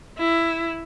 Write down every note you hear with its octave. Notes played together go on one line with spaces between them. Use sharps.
E4